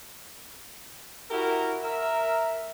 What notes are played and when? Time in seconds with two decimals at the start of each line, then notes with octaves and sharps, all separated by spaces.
1.30 E4 F#4 G4 A#4
1.83 A#4 E5